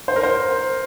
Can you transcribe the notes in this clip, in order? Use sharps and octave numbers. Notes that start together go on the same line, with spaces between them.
C5
A#4
C5